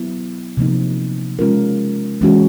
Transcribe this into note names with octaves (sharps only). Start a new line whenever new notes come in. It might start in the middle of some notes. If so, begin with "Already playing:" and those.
Already playing: F#3 B3 E4
C3 F3 A#3 D#4
G#3 C#4 F4 A#4
E3 G#3 C#4 F#4